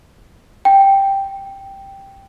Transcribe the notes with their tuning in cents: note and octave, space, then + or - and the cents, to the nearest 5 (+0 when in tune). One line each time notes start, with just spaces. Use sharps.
G5 +0